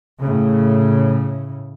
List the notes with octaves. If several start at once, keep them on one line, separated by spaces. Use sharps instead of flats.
A2 C#3